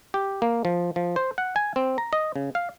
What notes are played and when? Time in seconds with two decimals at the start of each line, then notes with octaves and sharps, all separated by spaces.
0.14 G4
0.42 A#3
0.65 F3
0.96 F3
1.16 C5
1.38 F#5
1.56 G#5
1.76 C4
1.98 A#5
2.13 D#5
2.36 C#3
2.55 F5